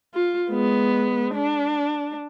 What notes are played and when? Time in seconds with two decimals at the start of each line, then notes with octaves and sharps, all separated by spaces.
0.14 F4
0.51 G#3 B3
1.35 D4